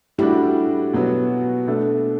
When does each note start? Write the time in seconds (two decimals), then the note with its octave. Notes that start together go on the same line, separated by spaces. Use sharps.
0.18 A2 G3 D4 E4 F#4 G4
0.93 B2 F#3 B3 F#4
1.67 B2 A3 D4 A4